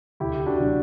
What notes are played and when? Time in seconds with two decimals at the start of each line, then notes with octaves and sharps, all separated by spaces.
0.20 D2 E4 G4
0.46 D4 F#4
0.60 D3 F#3